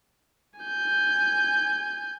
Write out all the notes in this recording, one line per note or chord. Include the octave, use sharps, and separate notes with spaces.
G#5 G6